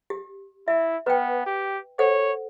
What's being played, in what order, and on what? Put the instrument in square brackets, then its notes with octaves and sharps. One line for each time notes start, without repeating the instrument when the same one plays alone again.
[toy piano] G4
[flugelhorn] E4 [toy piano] E5
[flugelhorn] B3 [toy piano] B4 G5
[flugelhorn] G4
[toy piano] A4 C5 F#5 [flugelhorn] C#5